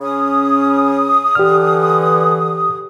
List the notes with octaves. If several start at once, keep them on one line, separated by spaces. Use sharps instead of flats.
C#3 C#4 D#6
D3 E3 G4 F6